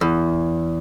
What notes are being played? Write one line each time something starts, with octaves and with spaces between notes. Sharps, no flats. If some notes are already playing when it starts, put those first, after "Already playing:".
E2